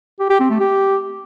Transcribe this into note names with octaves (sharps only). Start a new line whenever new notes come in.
G4
G4
C4
A3
G4